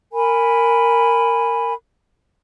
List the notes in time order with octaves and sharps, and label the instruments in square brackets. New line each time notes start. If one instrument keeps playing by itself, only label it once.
[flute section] A#4 G#5 B5